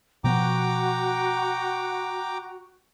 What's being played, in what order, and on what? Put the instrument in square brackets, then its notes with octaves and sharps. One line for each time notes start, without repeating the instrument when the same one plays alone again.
[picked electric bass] B2 F3 B3 [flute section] F#4 [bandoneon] G5 A#5 D6